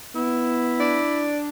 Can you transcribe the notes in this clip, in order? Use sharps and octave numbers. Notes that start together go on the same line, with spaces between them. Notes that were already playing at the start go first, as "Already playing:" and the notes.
B3 E4
D4 D5